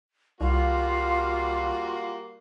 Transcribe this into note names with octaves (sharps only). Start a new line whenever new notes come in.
C2 G3 A#3 F4 F#4 F5